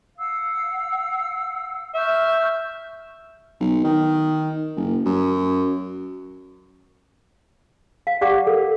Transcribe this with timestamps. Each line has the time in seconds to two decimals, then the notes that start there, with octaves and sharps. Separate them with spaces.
0.17 F5 F#5 E6
1.95 E5 C#6 F6 G6
3.60 B1
3.84 D#3
4.76 F#1
5.06 F#2
8.07 F5
8.21 G4 D5 F5 F#5 D6
8.47 A4 A#4